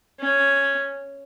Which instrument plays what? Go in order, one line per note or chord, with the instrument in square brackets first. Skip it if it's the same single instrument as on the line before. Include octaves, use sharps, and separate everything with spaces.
[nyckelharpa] C#4